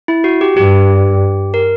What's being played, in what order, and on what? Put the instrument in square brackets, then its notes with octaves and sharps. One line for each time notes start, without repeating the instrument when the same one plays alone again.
[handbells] E4
F#4
G4
[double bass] G2 [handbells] G4
[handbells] A#4